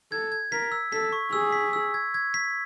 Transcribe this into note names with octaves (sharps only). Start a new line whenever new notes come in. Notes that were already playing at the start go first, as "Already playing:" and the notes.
A4 G#6
G#6
A#4 B6
E6
A4 B6
C#6
G#4 E6
B6
E6
G#6
G#6
B6